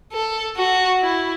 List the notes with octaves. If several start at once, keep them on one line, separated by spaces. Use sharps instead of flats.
A4
F#4
E4